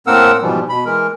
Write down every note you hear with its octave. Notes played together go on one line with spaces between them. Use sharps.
A2 A#3 C4 A#4 F#5 E6
G#2 B2 E3 F3 G3
B2 B5
E3 G#3 A#4